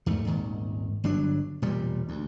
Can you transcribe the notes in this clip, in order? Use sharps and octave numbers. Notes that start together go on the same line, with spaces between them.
E2 G#2 A3
D#1 G#1 G#2 D#3
G1 F#3 D4
E1 A#2 G3
D2